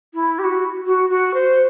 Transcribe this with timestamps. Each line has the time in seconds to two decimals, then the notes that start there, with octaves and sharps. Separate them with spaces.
0.14 E4
0.38 G4
0.43 F#4
0.86 F#4
1.09 F#4
1.34 C5